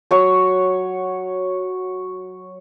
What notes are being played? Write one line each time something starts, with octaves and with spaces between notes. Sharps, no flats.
F#3 C#5 F#5